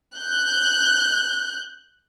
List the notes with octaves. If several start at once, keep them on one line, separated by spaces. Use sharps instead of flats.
F#6 G6